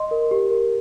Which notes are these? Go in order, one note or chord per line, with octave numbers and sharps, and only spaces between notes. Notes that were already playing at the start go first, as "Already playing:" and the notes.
Already playing: D#5 C6
A#4
G4
A#4